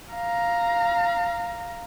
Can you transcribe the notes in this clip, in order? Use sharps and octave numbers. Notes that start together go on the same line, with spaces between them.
F5 A#5